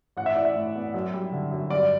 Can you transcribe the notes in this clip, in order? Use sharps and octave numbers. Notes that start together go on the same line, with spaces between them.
A1 F#5
E5
E3 D5
E5
A2
B3
F#2
G3
D3
F#2
G2 D5